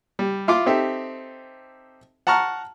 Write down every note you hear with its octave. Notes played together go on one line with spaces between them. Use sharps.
G3
E4 F4 C6 D6
C4 D#4 G4 A4 E5
F#5 A5 A#5 C#6 F6